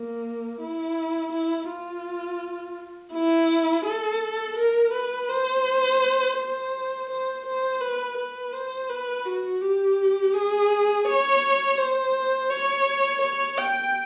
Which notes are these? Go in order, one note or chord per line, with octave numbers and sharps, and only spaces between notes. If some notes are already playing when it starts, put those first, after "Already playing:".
Already playing: A#3
E4
E4
F4
E4
A4
A#4
B4
C5
C5
C5
C5
B4
B4
C5
B4
F#4
G4
G#4
C#5
C5
C#5
C#5
G5